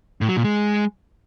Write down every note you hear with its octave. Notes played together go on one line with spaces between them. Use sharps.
A2
F#3
A#2
G#3